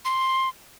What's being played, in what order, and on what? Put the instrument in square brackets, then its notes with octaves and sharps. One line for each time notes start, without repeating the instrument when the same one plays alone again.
[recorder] C6